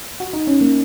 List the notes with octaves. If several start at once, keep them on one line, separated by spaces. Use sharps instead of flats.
F#4
D#4
C#4
A#3